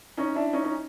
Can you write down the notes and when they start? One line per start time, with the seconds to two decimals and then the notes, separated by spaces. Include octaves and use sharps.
0.17 C#4 D#4
0.35 D4 E4
0.53 C#4 D#4
0.64 C#4 D#4